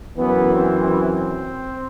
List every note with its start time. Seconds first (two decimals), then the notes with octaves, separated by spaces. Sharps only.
0.17 F#2 E3 B3
0.54 C4
0.91 C4